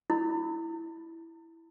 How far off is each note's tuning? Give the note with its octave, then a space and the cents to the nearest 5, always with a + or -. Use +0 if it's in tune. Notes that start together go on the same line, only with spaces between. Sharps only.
E4 +0 B5 +0